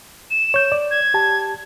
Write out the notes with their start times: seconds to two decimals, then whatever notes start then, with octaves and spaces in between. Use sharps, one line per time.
0.31 E7
0.54 C#5 G6
0.72 D5
0.91 G#6
1.14 G4 A5